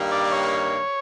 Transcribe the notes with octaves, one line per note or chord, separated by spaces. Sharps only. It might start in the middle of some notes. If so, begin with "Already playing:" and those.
Already playing: G2 D#3 G3 A#3
D5
C#5